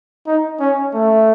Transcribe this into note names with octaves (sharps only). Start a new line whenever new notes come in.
D#4
C#4
A3